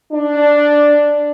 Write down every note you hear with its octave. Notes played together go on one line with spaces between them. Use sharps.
D4